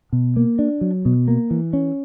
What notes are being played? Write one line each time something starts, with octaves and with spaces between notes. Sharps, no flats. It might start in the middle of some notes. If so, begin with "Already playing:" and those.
B2
A#3
D4
F#3
B2
A#3
E3
C#4